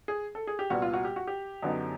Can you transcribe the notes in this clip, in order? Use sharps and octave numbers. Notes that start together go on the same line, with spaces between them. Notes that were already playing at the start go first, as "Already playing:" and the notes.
G#4
A4
G#4
G4
C2 A#2 G3 B3 F#4
F4
F#4
G4
F#4
G4
F#2 D3 F#3 B3 D#4